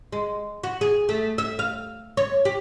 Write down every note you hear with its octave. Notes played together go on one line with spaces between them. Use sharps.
G#3
F#4
G#4
A3
E5
F5
C#5
G4